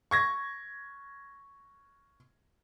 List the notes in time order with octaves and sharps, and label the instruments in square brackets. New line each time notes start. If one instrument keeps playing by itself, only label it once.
[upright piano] C#6 G#6 A#6